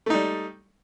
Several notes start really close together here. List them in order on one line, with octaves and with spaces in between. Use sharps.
A3 D#4 G3